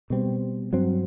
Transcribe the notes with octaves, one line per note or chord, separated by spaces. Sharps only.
B2 G3 C4
G2 F#3 C4